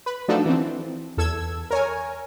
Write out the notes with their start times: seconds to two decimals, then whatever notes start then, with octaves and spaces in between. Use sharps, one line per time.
0.06 B4
0.28 F3 A3 D4 D#4 F#4 A4
0.46 E3 C4
1.17 E2 A4 E6 G#6
1.71 A#4 C#5 G#5